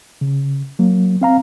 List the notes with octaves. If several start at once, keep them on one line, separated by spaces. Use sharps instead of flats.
C#3
F#3 A#3
C4 F5 A#5